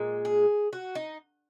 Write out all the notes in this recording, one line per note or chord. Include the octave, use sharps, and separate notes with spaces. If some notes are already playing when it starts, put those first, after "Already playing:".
Already playing: A#2 G#3
G#4
F#4
D#4